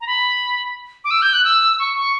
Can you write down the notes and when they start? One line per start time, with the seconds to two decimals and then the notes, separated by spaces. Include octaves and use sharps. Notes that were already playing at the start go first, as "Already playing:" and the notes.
0.01 A#5
0.07 B5
1.04 D6
1.11 E6
1.22 G6
1.33 F#6
1.45 E6
1.79 C#6
1.97 C#6